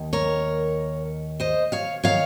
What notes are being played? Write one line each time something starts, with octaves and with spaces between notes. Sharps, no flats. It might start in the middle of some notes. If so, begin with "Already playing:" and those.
Already playing: D#2 D#3
A#4 C#5
C5 D#5
C#5 F5
D#3 C#5 F5